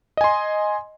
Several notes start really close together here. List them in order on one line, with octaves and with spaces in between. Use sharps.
D#5 G#5 C6